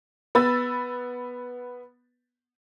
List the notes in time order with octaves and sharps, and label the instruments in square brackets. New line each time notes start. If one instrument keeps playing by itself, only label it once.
[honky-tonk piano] B3 B5 E6 A6